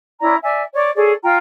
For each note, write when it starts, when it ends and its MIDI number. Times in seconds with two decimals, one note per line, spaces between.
0.21 0.35 61
0.21 0.35 64
0.21 0.35 74
0.21 0.35 82
0.42 0.63 74
0.42 0.63 76
0.42 0.63 80
0.74 0.90 73
0.74 0.90 74
0.95 1.12 68
0.95 1.12 69
0.95 1.12 73
0.95 1.12 74
1.22 1.37 65
1.22 1.37 79
1.22 1.37 82